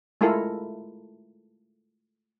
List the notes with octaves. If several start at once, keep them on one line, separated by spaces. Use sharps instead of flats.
G#3 A3 E4 F4 A4 A#4